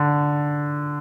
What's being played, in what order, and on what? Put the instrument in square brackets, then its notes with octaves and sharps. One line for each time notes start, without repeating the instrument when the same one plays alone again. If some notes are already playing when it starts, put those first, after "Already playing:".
Already playing: [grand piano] D3